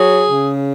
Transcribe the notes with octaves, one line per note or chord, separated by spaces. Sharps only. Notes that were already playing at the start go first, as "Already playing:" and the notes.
Already playing: F#3 G#4
C#3